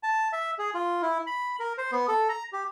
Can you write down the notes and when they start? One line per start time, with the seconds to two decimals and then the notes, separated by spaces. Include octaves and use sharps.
0.03 A5
0.32 E5
0.59 G#4
0.74 F4
1.02 E4
1.27 B5
1.60 A#4
1.78 C5
1.92 B3
2.08 A4
2.29 A#5
2.53 G4